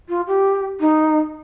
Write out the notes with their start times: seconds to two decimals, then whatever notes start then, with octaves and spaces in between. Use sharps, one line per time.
0.09 F4
0.27 G4
0.80 D#4